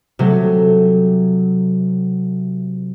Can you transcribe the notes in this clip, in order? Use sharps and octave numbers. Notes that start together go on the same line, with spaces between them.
C3 F#3 A3